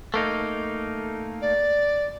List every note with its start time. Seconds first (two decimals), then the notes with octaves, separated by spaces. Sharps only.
0.14 A3 A#3 D#4
1.42 D5